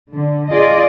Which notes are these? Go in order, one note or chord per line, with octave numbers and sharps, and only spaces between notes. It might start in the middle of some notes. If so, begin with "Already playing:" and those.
D3
F4 G#4 D5 D#5